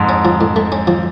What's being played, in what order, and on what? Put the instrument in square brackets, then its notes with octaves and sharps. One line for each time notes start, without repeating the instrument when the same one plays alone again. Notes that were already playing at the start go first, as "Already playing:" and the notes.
Already playing: [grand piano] F2 G#2
[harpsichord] C#4
F3
A2
A3
C#4
F3